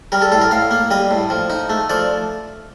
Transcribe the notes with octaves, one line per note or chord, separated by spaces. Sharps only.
G3 A#4
A4
A2 A4
A#4
A2 F5
A#3
G3 D#5
A2
F3
D#4
A3
F3 D5